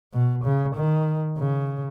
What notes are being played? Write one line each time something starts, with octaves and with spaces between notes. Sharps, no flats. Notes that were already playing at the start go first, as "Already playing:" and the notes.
B2
C#3
D#3
C#3